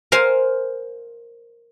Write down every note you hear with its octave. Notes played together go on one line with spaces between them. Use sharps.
A#4 C5 F5 G#5